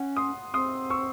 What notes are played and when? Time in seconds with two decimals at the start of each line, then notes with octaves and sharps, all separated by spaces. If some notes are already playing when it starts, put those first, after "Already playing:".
Already playing: C#4 F#5
0.17 C6 D#6
0.53 C4 C6 D#6
0.90 C#6 E6